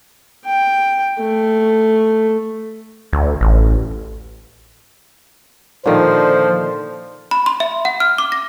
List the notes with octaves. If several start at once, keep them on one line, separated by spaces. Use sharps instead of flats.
G5
A3
D2
A1
A#2 D3 D#3 F3 C5
B5
C6
E5
F#5
F6
D6
A#6